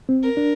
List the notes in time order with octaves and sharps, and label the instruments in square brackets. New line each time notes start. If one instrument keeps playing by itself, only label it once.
[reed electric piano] C4
[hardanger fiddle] A#4
[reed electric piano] D4